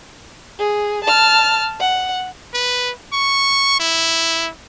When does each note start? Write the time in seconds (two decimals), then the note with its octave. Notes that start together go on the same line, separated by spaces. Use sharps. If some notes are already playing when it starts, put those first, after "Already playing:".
0.59 G#4
1.04 A5 F6
1.81 F#5
2.54 B4
3.13 C#6
3.80 E4